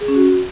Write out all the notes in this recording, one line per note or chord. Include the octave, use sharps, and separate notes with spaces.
G#4
C#4
F#4